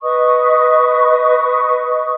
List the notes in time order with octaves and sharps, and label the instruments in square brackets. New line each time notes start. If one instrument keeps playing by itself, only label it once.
[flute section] B4 D#5 C#6 D#6